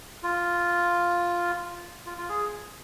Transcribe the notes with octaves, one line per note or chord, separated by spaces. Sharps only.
F4
F4
F4
G#4